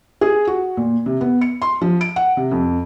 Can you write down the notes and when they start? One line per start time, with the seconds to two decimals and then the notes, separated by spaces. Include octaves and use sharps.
0.21 G#4
0.47 F#4
0.77 A#2
1.06 C3
1.21 B3
1.41 C#7
1.62 C6
1.81 F3
2.01 D7
2.16 F#5
2.37 C3
2.51 F2